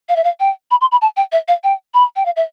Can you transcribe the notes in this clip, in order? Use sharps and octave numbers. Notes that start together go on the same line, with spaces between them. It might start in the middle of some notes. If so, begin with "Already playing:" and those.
F5
E5
F5
G5
B5
C6
B5
A5
G5
E5
F5
G5
B5
G5
F5
E5